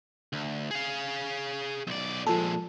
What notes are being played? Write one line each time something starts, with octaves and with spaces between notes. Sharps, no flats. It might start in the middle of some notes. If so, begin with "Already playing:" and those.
D2
G#4 F5
B1 D5
A#2 F3 G#3 A4